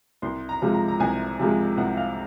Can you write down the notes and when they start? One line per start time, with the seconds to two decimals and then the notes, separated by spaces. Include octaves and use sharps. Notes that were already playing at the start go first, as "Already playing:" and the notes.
0.22 C2 C6
0.49 A#5
0.62 C3 F3 G#3
0.74 A#5
0.88 A#5
1.00 C2 G#5
1.39 C3 F3 G#3
1.77 C2 F#5
1.97 F5